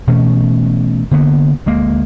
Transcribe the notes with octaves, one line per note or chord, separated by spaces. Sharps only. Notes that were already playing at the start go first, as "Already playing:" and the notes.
B2 E3 A3 C#4
D3 A#3 B3
D2 G#3 A#3